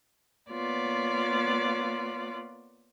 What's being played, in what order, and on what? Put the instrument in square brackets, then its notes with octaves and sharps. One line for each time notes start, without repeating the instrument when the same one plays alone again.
[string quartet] A#3 B3 F4 C#5 D5